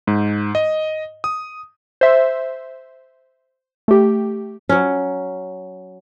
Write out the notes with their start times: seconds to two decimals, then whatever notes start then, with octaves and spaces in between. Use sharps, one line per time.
0.07 G#2
0.55 D#5
1.24 D#6
2.01 C5 E5
3.88 A3 G4
4.69 F#3 C#4